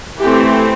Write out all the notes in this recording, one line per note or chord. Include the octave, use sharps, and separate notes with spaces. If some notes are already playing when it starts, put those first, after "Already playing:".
E3 A3 C4 G4